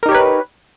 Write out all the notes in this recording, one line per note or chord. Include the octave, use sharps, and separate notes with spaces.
D#4 G4 A#4 B4 C#5